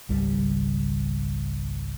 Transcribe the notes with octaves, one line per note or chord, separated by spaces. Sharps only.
G#1 C#2 G3